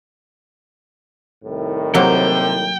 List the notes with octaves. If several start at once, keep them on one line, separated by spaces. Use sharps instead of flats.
C2 A2 D#3
C3 F#3 A#3 C5 G5